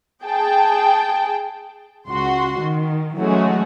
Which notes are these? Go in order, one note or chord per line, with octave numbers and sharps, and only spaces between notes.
G#4 G5 A5
C#2 F#4 C6
D#3
E3 F#3 G#3 A3 C#4 F#4